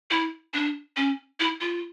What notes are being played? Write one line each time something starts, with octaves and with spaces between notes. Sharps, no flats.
E4
D4
C#4
E4
F4